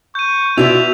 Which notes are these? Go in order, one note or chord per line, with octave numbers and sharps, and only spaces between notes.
C#6 G6 D#7
B2 E4 F4 D5 E5 F7